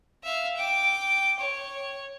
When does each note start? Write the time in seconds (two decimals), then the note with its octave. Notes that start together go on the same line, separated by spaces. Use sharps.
0.24 E5 F5
0.57 G5 D6
1.39 C#5